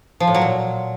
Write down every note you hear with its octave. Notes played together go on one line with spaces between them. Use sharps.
F3
A2
F#3
A#2